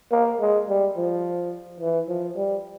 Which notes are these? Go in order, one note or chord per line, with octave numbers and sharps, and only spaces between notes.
A#3
G#3
G3
F3
E3
F3
G3